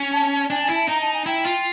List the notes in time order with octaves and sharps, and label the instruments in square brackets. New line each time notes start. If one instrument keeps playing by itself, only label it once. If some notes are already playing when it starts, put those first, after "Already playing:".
Already playing: [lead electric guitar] C#4
[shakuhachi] A5
A5
[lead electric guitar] D4 [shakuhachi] G#5
[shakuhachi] G#5
[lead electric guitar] E4
[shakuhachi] A5
[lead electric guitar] D#4 [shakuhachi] A#5
[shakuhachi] A5
G#5
[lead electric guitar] E4 [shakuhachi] G5
[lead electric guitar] F4